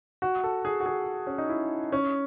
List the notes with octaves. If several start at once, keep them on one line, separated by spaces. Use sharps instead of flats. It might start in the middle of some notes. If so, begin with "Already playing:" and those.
F#4
A4
G#4
F#4
G#4
C#4
D#4
E4
C#4